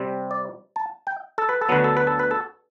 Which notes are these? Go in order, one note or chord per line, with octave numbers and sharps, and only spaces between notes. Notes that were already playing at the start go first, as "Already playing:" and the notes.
Already playing: C3 G3 C4
D5
A5
G5
A4
B4
A4
D2 D3 F#3 B3 B4
A4
B4
A4
B4
A4